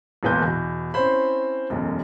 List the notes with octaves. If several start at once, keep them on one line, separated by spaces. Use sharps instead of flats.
E1 A#1 A#2 B4 C6 G6
E2 B2
C4 C#4 E4 C5 B5
E1 B1 F#2